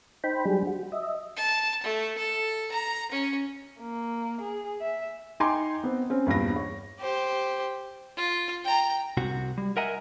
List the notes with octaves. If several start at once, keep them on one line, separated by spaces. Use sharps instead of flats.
D#4 C5 G5 B5
F#3 G3 D4 G4 G#4
F#4
D#5 E5
A5
A3
A4
A#5
C#4
A#3
G#4
E5
D#4 G5 G#5 A#5 C6 D6
B3 C4
C4 C#4
E2 G2 A#2 A#6
C#5
G4 C5
F4
G5 A#5
C2 C3 F#4
G3
A#4 D#5 E5 F#5 G#5 A#5